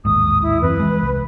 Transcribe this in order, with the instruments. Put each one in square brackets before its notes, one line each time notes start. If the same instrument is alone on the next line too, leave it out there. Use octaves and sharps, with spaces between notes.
[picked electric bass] A1 D#2 G#2 [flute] D#6
[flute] E4
[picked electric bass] F#2 E3 C4 [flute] B4
[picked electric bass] E3 G#3
C2